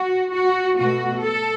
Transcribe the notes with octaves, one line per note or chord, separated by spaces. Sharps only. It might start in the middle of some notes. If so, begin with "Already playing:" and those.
Already playing: F#4
F#4
B2 A3 F#4
A4